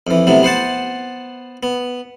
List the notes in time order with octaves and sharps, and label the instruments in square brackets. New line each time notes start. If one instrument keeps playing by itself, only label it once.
[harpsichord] F2 E3
A2 C3 F#3 B3
B3 C5 F#5 A5
B3